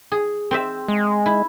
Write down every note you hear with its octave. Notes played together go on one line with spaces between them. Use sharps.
G#4
C4 C5 E5
G#3
E4